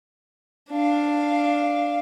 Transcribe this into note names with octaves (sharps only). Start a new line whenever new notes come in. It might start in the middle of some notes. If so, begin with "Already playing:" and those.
D4 F5